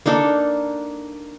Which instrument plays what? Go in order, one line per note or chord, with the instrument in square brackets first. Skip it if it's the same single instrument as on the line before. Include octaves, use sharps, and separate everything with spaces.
[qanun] A#3 D4 D#4 A4